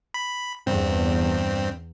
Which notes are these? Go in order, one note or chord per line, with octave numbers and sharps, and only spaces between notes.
B5
E2 G2 C4